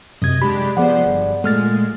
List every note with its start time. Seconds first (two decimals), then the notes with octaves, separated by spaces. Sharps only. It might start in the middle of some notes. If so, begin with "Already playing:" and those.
0.22 F#2 C3 D#5 G#6
0.42 G#3 D4 G4 B5
0.77 F3 B3 G#4 C5 D5 F#5
1.06 G1
1.44 A#2 G#3 A3 F6 A6